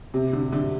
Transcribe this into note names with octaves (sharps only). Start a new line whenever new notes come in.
C3
D3
D3